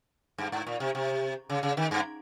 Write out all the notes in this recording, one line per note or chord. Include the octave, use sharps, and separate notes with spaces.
G2
G#2
A#2
C3
C3
C#3
C#3
D#3
G2